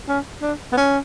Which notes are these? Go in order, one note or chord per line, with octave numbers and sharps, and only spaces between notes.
C#4
D4
B3
C#4